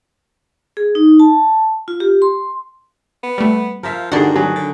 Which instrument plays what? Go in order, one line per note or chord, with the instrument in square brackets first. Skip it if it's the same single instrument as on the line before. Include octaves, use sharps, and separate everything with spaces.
[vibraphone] G#4
D#4
A5
F4
G4
C6
[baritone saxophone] B3
[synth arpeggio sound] G3 A3
[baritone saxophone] F3 [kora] A#4 E5 F5
[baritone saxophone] G2 [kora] D3 D#3 [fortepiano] F#4 G#4 [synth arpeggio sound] D5 F#5
[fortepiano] F#3 [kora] G#4
[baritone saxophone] D3